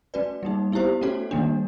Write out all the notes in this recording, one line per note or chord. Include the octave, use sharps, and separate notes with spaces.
A3 C#4 F#4 B4 D5
G3 A#3 D#4
B3 E4 G4 C5
A3 C#4 F#4 A4 C#5
D#3 G3 A#3 D4